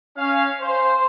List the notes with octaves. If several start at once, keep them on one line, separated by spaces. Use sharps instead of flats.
C#4 F5
C5